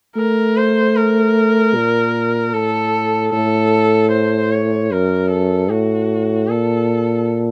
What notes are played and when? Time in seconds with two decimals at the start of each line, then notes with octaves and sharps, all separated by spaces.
0.16 A3 A#4
0.57 C5
0.96 A#4
1.76 A#2
2.53 A2 A4
3.33 A2 A4
4.11 C5
4.52 C#5
4.92 F#2 A#4
5.31 A4
5.70 A2 F#4
6.49 A#2 A4